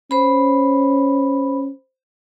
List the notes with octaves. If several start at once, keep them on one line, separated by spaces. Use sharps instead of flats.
C#4 C5 B5